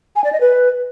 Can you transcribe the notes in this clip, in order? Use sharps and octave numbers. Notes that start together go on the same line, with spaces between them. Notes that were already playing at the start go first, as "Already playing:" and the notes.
G#5
D5
D#5
B4